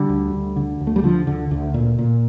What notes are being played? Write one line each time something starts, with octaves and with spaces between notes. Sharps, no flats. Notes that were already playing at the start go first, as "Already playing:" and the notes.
Already playing: D3 G3
D2
D2
D3
D2
A3
G3
D3 F3
D2 D3
D2 D3
A#2
A#2